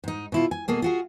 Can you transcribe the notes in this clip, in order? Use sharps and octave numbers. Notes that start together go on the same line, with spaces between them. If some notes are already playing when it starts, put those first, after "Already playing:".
G#2 D#4
B2 E4 F4
G#5
B2 A#3 G#4 A4
F4 F#4 G#4